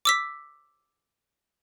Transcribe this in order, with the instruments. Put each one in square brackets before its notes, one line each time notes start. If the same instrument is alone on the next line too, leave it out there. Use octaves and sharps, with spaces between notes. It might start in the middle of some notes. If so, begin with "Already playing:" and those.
[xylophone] D6 E6 B6